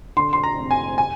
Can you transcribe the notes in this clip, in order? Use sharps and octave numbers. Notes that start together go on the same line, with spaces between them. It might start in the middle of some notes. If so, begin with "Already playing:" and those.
D3 C6
C6
A#5
F1
G#5
G#5